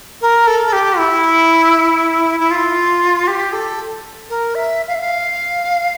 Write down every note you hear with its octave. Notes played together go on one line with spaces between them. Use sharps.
A#4
A4
A4
G4
E4
E4
F4
G4
A4
A#4
E5
F5
E5
F5